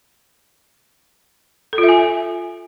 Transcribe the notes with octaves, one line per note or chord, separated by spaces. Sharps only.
A4
F4
E5
G#5